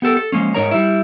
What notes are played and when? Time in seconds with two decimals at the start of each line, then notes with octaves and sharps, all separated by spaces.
0.02 B3 G4 A4 A#4
0.17 A4
0.32 F3 G#3 A#3 C#4
0.54 G#2 B2 D#4 A#4 C#5 A#5
0.71 G3 E4